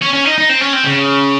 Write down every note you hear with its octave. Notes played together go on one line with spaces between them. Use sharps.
C#4
C#4
D#4
D#4
C4
C#4
C4
C#3